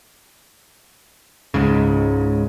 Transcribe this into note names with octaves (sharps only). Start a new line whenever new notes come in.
C#2 G#2 C#3